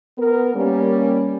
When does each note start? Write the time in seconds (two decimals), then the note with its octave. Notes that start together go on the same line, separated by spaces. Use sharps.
0.18 B3 A#4
0.54 G3 A#3 C#4